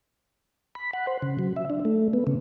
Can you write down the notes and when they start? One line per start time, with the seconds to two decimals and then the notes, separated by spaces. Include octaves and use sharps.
0.75 B5
0.93 F#5
1.07 C5
1.22 C#3
1.39 F#3
1.56 E5
1.70 D4
1.85 A3
2.13 B3
2.27 C#3